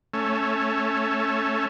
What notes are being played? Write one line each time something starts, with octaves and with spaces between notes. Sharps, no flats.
A3 C#4